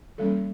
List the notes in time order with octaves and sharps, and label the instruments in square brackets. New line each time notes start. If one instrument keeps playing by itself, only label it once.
[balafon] E3 G3 A#3 C#4 A4